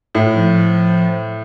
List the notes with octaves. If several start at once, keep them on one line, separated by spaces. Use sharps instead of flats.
A2
F3